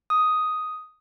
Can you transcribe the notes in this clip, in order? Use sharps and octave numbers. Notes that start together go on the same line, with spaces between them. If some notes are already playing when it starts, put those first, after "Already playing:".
D#6